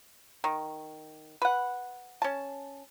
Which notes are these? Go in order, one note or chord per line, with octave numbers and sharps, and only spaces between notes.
D#3
B4 F#5
C#4 A5